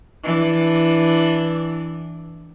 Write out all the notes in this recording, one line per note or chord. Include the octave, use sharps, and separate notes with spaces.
E3 D4